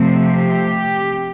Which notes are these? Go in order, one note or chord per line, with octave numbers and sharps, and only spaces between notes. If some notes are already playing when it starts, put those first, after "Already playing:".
Already playing: C3 F3 A3 C4
G4